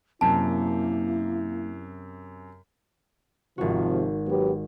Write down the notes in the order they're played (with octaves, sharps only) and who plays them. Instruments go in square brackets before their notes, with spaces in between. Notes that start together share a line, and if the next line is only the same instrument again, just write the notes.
[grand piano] F#2 C3 [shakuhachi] A#3 [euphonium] E4 [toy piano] A5
[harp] G#1 F#4 [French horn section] C3 F3
[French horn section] F#3 B3 G4